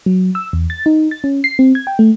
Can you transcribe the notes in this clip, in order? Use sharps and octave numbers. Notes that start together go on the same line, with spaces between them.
F#3
E6
E2
A6
D#4
A6
C#4
C7
C4
G#6
G5
A3